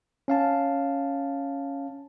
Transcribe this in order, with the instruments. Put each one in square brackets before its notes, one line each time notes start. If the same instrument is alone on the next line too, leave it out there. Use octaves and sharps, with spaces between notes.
[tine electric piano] C#4 F5 A5